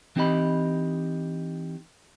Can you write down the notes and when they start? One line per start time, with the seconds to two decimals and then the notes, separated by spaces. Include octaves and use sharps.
0.16 E3 C4 D#4 G4 D#5 B5